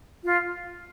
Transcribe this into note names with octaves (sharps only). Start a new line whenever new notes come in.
F4